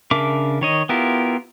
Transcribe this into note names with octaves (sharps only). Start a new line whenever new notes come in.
C#3 D4 A#4 E5 D6
D#3 C#5 D#5
B3 E4 F4 G4 A#4